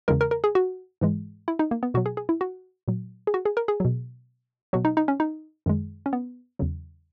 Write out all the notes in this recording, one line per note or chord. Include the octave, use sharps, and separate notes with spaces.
E2 C#3 E3 G#3 A#4
A#4
A#4
G#4
F#4
G#2 E3 G#3
E4
D#4
A#3
B3
B2 F#3 F#4
G#4
G#4
E4
F#4
A#2 F#3
G#4
F#4
G#4
A#4
G#4
B2 F#3
B2 F#3 F#4
D#4
D#4
C#4
D#4
F#2 D#3 G#3
C#4
B3
E2 C#3 F#3